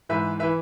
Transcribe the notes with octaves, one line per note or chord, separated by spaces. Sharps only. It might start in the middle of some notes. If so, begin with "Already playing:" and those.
G#2 E3 B4 E5
E3 B4 E5